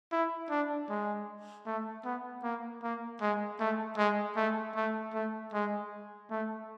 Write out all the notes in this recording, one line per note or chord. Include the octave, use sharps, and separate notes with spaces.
E4
D4
G#3
A3
B3
A#3
A#3
G#3
A3
G#3
A3
A3
A3
G#3
A3